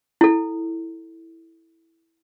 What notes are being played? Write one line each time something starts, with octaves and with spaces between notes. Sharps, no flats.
E4 A4